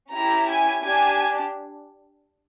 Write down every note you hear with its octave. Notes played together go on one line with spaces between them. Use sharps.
C#4 E4 G4 A#5
G#5
D4 G4 G#5